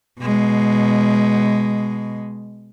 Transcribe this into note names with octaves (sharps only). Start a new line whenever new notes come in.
B2 G#3